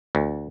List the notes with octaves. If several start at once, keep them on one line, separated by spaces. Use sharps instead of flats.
D2